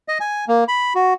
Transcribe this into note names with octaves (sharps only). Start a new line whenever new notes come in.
D#5
G#5
A#3
B5
F#4